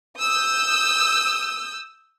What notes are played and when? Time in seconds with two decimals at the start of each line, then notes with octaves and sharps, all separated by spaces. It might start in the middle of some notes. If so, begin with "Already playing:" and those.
0.19 D#6 E6 G6